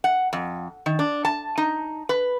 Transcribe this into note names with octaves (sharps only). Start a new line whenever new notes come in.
F#5
F2
D#3
D4
A5
D#4
B4